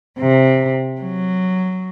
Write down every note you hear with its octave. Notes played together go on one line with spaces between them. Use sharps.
C3
F#3